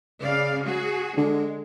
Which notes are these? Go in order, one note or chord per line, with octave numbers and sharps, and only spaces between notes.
C#3 D5 F5
F#4 G#4
D3 G#3